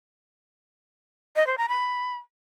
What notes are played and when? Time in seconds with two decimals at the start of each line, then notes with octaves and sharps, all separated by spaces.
1.36 D#5
1.47 C5
1.58 A#5
1.69 B5